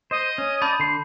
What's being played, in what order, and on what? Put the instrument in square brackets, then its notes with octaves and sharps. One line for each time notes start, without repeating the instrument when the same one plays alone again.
[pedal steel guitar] C5 [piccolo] D#5
[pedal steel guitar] C#4
[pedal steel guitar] D5 [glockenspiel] A5 B5 G6
[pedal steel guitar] D3 C6